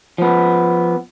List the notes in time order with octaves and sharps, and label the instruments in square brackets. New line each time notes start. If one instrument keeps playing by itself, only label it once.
[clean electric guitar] F3 B3